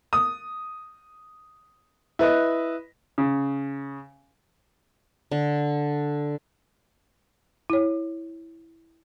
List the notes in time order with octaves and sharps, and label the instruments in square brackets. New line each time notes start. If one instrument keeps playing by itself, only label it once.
[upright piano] D#6
E4 B4 D#5
[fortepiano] C#3
[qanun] D3
[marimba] E4 C#5